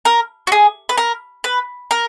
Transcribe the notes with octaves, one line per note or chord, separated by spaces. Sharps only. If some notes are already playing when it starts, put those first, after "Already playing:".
A#4
F#4
G#4
B4
A#4
B4
A#4